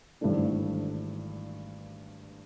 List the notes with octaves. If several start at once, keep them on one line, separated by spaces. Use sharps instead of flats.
G#1 G2 E3 A3 D4